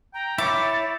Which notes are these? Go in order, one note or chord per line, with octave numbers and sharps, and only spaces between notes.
G5 A#5
E4 C#5 D6 A6